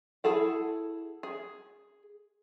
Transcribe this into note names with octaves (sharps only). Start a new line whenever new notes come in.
E4 G#4 A4 F#5
G#4